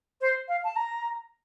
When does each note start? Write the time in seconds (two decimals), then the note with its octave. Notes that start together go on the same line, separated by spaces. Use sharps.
0.21 C5
0.48 F5
0.64 A5
0.76 A#5